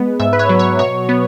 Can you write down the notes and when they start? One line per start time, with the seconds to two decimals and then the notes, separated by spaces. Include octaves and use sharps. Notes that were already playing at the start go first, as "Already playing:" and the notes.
Already playing: G#3 B3
0.20 G#2 E5
0.33 B4
0.39 C#5
0.49 F#3
0.59 C#5
0.79 B2 C#5
1.09 B3